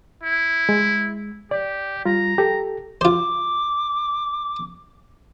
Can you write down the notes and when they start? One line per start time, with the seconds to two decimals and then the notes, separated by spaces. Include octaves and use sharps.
0.23 E4
0.69 G#3
1.51 G4 D5
2.06 G3 F4 A#5
2.38 G4 A4
3.01 F4 C5 D6